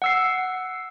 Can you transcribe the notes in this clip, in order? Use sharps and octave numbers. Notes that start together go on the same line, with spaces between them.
F#5 E6 C7